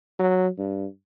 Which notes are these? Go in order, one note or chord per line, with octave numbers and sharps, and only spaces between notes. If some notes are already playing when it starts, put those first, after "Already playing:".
F#3
G2